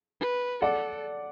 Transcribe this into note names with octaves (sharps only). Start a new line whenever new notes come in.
B4
A4 D5 F#5